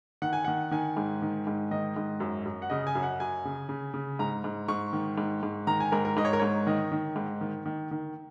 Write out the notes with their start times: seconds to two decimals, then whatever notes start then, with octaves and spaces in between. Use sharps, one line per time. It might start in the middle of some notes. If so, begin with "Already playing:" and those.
0.22 D#3 F#5
0.33 G#5
0.45 D#3 F#5
0.71 D#3 G#5
0.97 G#2
1.22 D#3
1.47 G#2
1.71 D#3 D#5
1.97 G#2
2.20 F#2
2.45 F#2
2.62 F#5
2.70 C#3 D#5
2.87 G#5
2.95 F#2
3.03 F#5
3.20 F#2 G#5
3.45 C#3
3.69 C#3
3.94 C#3
4.19 G#2 A#5
4.44 G#2
4.68 G#2 C#6
4.93 D#3
5.18 G#2
5.43 G#2
5.67 D#3 A#5
5.80 G#5
5.92 G#2 A#4
6.05 A#4
6.17 G#2 D#5
6.25 C#5
6.33 A#4
6.40 G#2 C#5
6.67 D#3 D#5
6.92 D#3
7.16 G#2
7.41 D#3
7.66 D#3
7.91 D#3